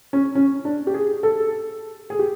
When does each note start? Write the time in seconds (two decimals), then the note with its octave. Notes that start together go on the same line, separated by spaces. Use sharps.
0.13 C#4
0.35 C#4
0.65 D4
0.87 G4
0.94 G#4
1.23 A4
2.10 G#4
2.19 G4